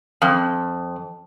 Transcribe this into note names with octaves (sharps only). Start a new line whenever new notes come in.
F2